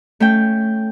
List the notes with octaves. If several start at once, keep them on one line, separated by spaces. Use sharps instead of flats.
A3 C#4 G5